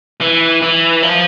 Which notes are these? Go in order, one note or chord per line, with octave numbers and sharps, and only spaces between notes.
E3
E3
F3